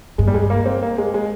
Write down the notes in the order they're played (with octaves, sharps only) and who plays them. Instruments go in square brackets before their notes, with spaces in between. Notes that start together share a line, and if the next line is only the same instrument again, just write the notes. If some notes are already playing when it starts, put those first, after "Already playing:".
[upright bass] G2 [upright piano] G#3
[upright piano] G3
G#3
A#3
C4
A#3
G#3
G#3